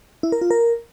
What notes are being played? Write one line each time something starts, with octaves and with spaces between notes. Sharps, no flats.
E4
A#4
F4
A#4